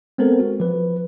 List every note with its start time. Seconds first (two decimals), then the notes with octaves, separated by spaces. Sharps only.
0.18 G#3 B3 C4 A4 A#4 C5
0.39 F#4
0.60 F3 B4